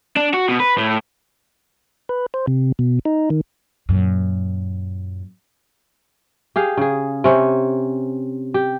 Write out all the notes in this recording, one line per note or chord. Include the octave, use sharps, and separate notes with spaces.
D4
F#4
B2
B4
A2
B4
C5
C3
B2
D#4
D#3
F#2 A#2
G4 G#4 F5
C#3 G#4
C3 C#4 G4
G4